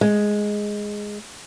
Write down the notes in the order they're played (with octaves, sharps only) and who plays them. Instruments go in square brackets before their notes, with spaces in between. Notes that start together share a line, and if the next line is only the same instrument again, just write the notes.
[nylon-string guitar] G#3